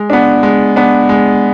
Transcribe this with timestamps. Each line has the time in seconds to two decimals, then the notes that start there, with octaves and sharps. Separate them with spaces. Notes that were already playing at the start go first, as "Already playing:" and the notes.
Already playing: G#3
0.10 B3 D4
0.43 G#3
0.76 B3 D4
1.09 G#3